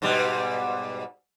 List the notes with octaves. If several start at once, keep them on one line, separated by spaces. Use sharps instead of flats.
G#2 B2 G3